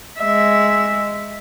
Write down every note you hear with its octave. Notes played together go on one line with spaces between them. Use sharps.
G#3 E5